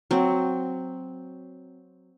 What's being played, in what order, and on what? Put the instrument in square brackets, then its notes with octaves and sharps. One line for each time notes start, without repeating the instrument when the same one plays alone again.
[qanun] F#3 C4